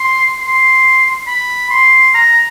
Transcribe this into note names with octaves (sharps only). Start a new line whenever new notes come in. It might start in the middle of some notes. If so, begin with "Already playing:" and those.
Already playing: C6
C6
B5
C6
A#5